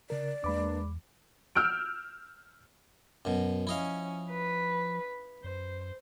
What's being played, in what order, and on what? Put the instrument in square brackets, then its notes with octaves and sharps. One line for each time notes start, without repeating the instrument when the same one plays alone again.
[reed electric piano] C#3 A#4 [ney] D5
[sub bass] E2 [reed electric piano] G#3 B5 D6 [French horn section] A#3 D4 B4
[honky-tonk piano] E6 F6 G6 D7
[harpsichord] F#2 B2
[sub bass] F3 [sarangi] C#4 [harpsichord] E4 D#5 F5
[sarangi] B4
[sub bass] F#2 [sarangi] C5